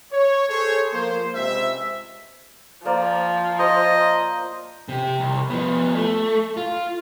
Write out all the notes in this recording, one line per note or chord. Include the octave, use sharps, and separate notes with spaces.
C#5
G#4 A4 C5 C#5
F3 A#3 C5
C#2 C3 G#3 C5 E5
F3 A#3 C5 D5
C5 D#5
C3 G4
C2
F3 B3
A3
F4